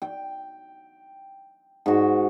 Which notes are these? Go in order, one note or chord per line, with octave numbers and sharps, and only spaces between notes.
G5
G#2 F#4